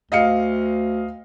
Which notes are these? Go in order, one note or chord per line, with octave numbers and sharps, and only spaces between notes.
D2 D#5 F5 C#7